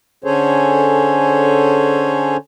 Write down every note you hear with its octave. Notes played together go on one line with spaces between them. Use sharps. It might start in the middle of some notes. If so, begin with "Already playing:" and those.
D3 C#4 G#4 A4 C5 C#5